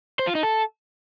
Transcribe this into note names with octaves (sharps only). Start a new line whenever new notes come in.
C5
F4
D#4
A4